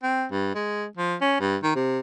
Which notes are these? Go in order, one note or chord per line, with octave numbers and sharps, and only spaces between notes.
C4
G2
G#3
F3
C#4
G2
D#3
C3